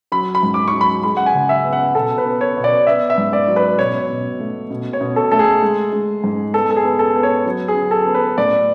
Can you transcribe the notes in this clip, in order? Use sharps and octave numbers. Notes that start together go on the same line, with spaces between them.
F#3 B5
B5
G#2
D6
F#3 C#6
B5
G#3 B5
F#5
G#5
C#3
E5
B3
F#5
B2 A4
B4
B3
C#5
B2
D5
B3 E5
E5
G#2
D5
F#3
B4
B2 C#5
B2
A3
B2
C#5
B2
A4
A3 A4
G#4
G#3
G#3
G#2
B3 A4
A4
G#4
B3
A4
B3
C#5
F#3
G#4
F#3
A4
B3
B4
A2 D5